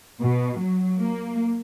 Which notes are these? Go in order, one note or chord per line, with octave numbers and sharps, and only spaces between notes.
B2
F#3
A#3